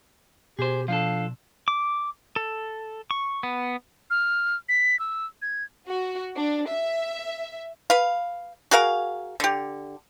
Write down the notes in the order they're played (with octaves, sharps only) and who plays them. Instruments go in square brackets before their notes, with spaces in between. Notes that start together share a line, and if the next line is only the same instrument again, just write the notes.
[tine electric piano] B2 [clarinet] G4 [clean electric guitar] G#4 C5
[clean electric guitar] F3 D4 A4 [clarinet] F5
[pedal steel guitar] D6
A4
C#6
B3
[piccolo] F6
B6
E6
G#6
[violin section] F#4
D4
E5
[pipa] B4 F5
F#4 G#4 A#4 F5
D3 G4